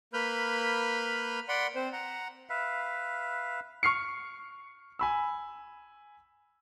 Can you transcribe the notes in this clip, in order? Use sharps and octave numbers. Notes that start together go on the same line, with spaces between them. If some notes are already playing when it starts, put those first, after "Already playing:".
A#3 B4 B5 F6 G6
D5 F#5 B5 C6
C4 C5
F#5 A#5
B4 E5 F5
C#6 F6 C7 C#7
G#5 B5 E6